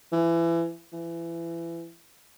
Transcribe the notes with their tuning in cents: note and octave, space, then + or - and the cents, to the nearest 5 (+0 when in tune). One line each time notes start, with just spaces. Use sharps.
E3 +25
E3 +25